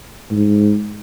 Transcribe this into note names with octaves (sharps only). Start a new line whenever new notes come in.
G#2